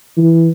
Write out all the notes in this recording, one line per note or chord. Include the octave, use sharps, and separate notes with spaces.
E3